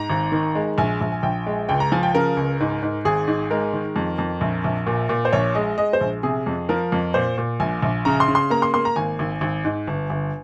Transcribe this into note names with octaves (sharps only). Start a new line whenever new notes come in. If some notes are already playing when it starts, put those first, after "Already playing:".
Already playing: G#2 A#5
G#1
D#3
G#3
A#1 G#5
A#1
G#5
A#1 G5
G#3
C#2 G5
A#5
F3 G#5
G5
C#3 A#4
C#2
G#2
G#2
G#1 G#4
G#2
G#3 A#4
D#3
F2
F2
A#1
A#1
A#2
A#2
C5
A#1 C#5
G#3 D#5
G#3 D#5
C5
A#1
C3 G#4
F2
F3 A#4
F2
A#2 C5
A#2
A#1 G#5
A#1
C#3 A#5
C6
C#3
C6
A#3 A#5
C6
A#3 C6
A#5
G#1 G#5
G#1
G#1
G#2
G1
G1